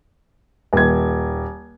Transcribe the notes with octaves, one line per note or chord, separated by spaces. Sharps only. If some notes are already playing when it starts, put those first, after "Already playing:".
D#1 G#6